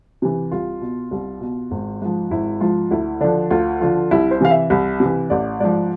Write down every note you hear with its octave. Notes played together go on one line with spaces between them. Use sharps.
C3 E3
C2 F4
B2
C2
B2
G#1
G#2 F3
G#1 E4
G#2 F3 F4
D2 E4
D3 F3 D4
D2 F4
D3 F3 F4
C2 E4
C5
C3 E3 F5
E5
C2
C3
E3
A1 D5
G#2 F3 D5